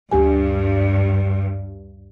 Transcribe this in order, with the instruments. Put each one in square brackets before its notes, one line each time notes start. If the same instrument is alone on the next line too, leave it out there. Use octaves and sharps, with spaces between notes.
[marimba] D2 G4 G#5 [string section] G2